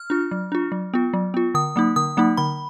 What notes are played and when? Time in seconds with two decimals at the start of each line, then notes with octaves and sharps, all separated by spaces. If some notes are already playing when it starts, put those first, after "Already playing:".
Already playing: F6
0.10 D4 F4
0.31 F#3
0.52 D4 F4
0.72 F#3
0.94 B3 F4
1.14 F#3
1.34 B3 F4
1.54 D3 D#6
1.76 F#3 A#3 D#4
1.96 D3 D#6
2.17 F#3 A#3 D#4
2.37 D3 B5